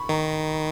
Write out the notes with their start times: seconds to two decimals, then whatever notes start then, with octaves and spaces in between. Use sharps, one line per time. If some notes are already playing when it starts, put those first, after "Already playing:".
Already playing: B5 C#6
0.09 D#3 A#5